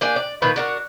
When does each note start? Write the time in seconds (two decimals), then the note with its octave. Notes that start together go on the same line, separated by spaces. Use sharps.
0.01 A#3 D4 G4 G#5
0.16 D5
0.42 A#2 D#3 A#4 B4
0.56 D4 F#4 A#4